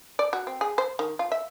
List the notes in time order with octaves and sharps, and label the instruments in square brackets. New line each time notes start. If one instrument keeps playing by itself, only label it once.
[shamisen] D5
F#4
C4
G#4
C5
D#3
F4
E5